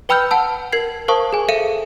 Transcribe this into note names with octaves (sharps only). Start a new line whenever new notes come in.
B4 G5 B5 E6 F6 G6
F#5 A5 E6
A#4 G#6 C7
A#4 C5 F5 A5 C#6 D#6
G#4 G#5
A4 E5 F5 C#7 D#7